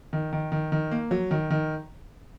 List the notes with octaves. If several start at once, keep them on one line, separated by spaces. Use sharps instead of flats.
D#3
D#3
D#3
D#3
A#3
F#3
D#3
D#3